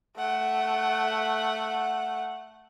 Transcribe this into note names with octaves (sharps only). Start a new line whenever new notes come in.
A3 F#5